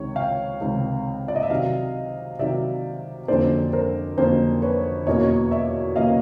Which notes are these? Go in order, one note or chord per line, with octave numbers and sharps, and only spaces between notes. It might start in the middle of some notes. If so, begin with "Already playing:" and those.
Already playing: C#2 C3 D#3 C#5
F5 G5
C#2 C3 D#3
D5
D#5
E5
C3 D#3 F#3 D#5 F5
C3 D#3 F#3 D5 E5
F2 D3 F#3 A#3 C#4 C5 D5
A#4 C5
F2 D3 F#3 A#3 C#4 A#4 C5
B4 C#5
E2 B2 F#3 A#3 C#4 C#5 D#5
D5 E5
B2 F#3 A#3 C#4 D#5 F5